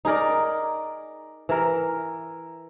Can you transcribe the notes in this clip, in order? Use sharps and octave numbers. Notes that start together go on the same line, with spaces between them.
D#4 G#4 A#4 D5
E3 A#4